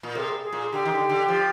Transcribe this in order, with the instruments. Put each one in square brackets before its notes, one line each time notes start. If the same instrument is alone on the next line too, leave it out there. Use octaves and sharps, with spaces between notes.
[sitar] A#2
[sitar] C3 [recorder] G#4 A#4
[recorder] G#4
[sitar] A#2
[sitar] D3 [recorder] G4
[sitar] D#3
D3
D3
F3